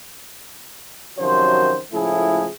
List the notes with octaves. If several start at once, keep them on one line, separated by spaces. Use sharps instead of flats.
F#2 C3 D#3 F3 F#3 C5
C#2 A2 F3 A3 E4 G#4